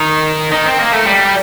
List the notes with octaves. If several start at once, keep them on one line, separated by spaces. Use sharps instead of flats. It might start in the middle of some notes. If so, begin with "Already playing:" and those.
Already playing: D#3
D#3
C4
A#3
A3
G3